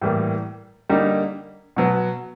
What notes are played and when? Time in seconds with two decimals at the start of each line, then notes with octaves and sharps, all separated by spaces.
0.02 A2 E3 G3 A#3
0.89 D3 G3 A#3 D#4
1.76 B2 F#3 B3